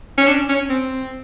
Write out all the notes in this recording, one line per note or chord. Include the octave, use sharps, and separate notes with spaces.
C#4
D4
C#4
C4